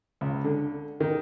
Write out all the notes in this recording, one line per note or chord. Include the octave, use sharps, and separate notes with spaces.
C#2
D3
D#3